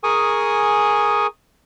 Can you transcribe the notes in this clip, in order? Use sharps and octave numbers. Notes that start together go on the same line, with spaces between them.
G#4 A#4 G#5 C#6 D#6